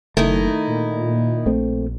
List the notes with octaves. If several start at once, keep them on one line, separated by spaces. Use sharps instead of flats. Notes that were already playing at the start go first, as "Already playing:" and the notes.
F#1 D#3 A3 D#4 E4
A#2
A#1 A3 C4